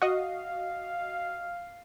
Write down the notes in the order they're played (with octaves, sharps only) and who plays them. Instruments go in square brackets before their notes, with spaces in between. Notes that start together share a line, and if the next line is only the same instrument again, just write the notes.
[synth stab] F#4 D#5 [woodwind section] F5